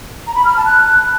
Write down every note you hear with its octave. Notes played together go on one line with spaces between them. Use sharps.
A#5
B5
F6
A5
F#6